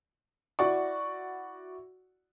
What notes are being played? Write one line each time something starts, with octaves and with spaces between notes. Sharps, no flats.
E4 F#4 D5 F#5 C#6